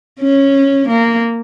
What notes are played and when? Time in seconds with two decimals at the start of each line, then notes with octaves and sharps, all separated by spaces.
0.20 C#4
0.88 A#3